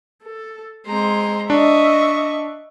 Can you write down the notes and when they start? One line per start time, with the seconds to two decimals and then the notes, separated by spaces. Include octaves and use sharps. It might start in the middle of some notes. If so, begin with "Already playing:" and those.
0.24 A4
0.87 G#3 C4 A#5 C6
1.50 D4 D#5 E5 C#6